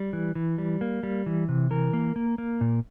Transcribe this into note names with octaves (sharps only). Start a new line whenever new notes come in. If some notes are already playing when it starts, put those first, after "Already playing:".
Already playing: G3
E3
E3
G3
A#3
G3
E3
C3
E3 A#4
A#3
A#3
A#3
A#2